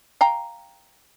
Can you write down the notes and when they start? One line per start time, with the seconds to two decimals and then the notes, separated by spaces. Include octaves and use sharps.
0.21 F5 G5 A#5